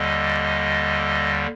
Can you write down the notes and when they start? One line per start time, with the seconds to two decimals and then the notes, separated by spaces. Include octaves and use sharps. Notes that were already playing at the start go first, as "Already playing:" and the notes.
Already playing: D#2 D3 G3 D#5